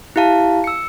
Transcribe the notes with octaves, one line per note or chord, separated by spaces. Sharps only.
E4 G4 F5 A5
E6 C#7